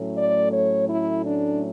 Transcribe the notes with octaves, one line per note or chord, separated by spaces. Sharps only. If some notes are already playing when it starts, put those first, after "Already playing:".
Already playing: A2 F#3 A3 C#4
D5
C#5
E4
D4